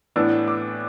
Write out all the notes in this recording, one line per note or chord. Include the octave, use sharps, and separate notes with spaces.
A2 E3 B3 D4 E6
D6